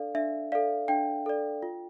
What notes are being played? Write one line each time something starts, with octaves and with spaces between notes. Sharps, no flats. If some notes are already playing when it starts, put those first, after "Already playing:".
Already playing: D4 A4 D5 F5
D4 E5
A4 D5 F5
D4 G5
A4 D5
F4